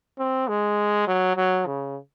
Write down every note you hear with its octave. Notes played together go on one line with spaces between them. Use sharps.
C4
G#3
F#3
F#3
C#3